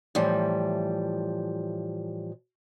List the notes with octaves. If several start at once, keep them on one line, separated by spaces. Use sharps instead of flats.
A2 E3 F3 G3